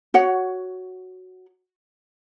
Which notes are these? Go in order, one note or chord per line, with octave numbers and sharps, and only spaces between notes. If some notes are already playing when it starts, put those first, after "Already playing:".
F#4 C#5 F#5